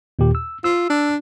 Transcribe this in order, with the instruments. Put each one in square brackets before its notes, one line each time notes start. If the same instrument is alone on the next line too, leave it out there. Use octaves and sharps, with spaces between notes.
[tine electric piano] D#2 A#2 G4
E6
[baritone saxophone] F4 [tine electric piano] E6
[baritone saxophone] D4